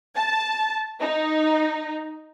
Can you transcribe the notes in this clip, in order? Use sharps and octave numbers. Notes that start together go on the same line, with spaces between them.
A5
D#4